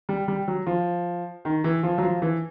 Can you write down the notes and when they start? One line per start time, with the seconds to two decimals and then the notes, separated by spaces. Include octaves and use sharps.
0.09 G3
0.28 G3
0.48 F#3
0.67 F3
1.45 D#3
1.64 E3
1.83 F3
1.98 F#3
2.03 F3
2.22 E3